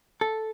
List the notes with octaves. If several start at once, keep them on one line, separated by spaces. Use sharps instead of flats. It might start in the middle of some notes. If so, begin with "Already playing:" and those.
A4